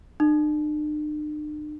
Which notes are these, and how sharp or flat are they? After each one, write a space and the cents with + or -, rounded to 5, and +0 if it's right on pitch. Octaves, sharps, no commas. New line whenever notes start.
D4 +45